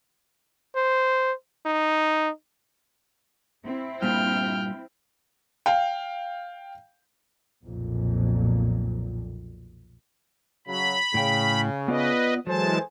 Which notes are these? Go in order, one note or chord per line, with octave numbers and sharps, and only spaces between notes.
C5
D#4
C4 E4
G2 A#2 G5 F6
F5 G5
B1 F2 A#2
C#3 F#3 B5
A2 C#3 G5
B3 F4 B4 D5 D#5
E3 F#3 G#3 A4 C5 G#5 A5